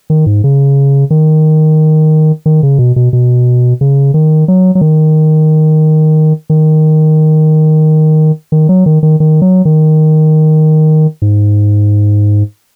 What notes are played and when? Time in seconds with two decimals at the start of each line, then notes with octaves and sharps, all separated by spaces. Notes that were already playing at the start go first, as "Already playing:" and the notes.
0.10 D#3
0.26 G#2
0.44 C#3
1.10 D#3
2.46 D#3
2.63 C#3
2.79 B2
2.96 B2
3.13 B2
3.81 C#3
4.14 D#3
4.48 F#3
4.75 F#3
4.81 D#3
6.50 D#3
8.52 D#3
8.69 F#3
8.86 D#3
9.03 D#3
9.20 D#3
9.42 F#3
9.65 D#3
11.22 G#2